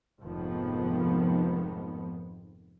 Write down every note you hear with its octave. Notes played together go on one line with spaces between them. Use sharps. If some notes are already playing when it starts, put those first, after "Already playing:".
F1 F2 G#2 D#3 F3 B3